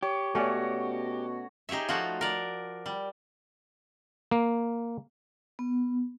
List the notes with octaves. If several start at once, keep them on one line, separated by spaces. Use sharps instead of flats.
G4 C#5
B2 A3 C#4 F#4 C#5 D5
D#4 G4 G#4 C#5 E5
F3 A3 F4 F#4
A#4 D5
G3
A#3
B3